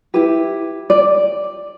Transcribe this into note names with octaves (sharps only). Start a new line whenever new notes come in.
E4 G4 B4
D5